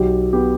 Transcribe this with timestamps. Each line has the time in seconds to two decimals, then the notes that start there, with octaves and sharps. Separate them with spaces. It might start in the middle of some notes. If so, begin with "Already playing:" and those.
Already playing: B1 G4
0.33 B3 G4